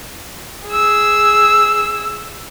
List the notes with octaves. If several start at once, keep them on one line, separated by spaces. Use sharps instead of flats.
G#4 E6